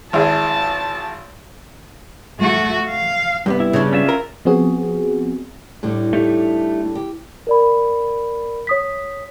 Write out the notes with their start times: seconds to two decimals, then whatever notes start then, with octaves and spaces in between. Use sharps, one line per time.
0.13 G#1 E4 G#4 A5
2.39 A3 F#4
2.90 F5
3.46 G2 C3 B3
3.60 E4
3.73 C#3 D4
3.93 C#4 F4 E5
4.09 A#4
4.45 F3 B3 C4 F#4 G#4
5.83 A2 D3 G3
6.13 A3 D#4 G4
6.95 G4
7.47 A#4 D5 B5
8.67 C#5 D#6 B6